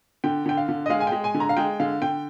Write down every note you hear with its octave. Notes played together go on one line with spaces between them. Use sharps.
D3 G5
D3 G5
F5
D3
D#5
G#3 F5
G#5
G#3 G5
G#5
D3
A#5
F5
G#3 G5
D3 F5
D3 G5